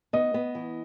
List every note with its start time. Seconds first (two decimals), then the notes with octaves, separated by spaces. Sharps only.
0.13 B3 D#5
0.34 B3
0.55 E3